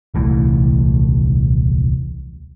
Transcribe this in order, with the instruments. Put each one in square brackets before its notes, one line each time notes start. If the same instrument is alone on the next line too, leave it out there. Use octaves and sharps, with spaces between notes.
[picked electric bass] D#1 C2 E3 A3